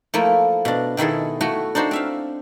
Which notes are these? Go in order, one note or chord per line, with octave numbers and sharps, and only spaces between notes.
F3 A3 A#3 E4
B2 D4
B2 D#3 E4 G#4 A4
A3 E4 F#4
D4 D#4 F#4 C5
C4 E5 F5